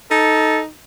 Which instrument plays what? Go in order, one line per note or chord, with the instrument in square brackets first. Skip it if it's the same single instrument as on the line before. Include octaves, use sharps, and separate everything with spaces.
[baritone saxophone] D#4 [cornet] A4